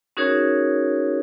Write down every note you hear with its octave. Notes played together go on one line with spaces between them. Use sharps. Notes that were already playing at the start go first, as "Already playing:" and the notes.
C#4 D#4 F#4 G#4 A#4 C#5